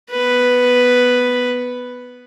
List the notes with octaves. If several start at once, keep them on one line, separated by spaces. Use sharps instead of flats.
B3 B4